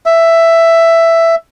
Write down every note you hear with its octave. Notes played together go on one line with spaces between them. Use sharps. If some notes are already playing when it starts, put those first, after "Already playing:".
E5